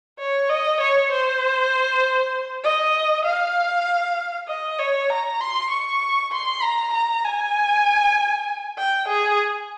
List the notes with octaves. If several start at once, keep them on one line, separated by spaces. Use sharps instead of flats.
C#5
D#5
C#5
C5
D#5
F5
D#5
C#5
A#5
C6
C#6
C6
A#5
A#5
G#5
G5
G#4